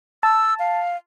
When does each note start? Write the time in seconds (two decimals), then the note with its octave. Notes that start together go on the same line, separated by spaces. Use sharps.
0.23 A5 E6
0.59 F5